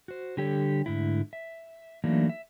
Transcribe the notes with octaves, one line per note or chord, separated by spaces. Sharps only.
F#4 C5
D3 G3 G4 A4 C#5
G#2 D3 A3 E4
E5
E3 F#3 A3 A#3 D4 D#4
E5